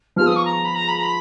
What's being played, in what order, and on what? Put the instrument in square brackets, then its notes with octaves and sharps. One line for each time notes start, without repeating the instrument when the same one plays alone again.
[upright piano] F3 B3 F4 G#4 [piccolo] F6
[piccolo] D#6
C#6
A#5
B5
A#5
B5
A#5
B5